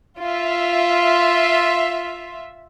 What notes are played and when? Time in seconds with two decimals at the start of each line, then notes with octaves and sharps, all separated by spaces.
0.21 F4 E5